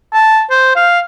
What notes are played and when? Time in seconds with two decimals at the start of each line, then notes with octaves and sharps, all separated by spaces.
0.13 A5
0.50 C5
0.76 F5